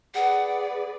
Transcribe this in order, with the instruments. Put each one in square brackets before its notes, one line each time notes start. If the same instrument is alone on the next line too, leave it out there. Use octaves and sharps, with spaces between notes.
[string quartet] G#4 B4 D5 [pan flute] F#5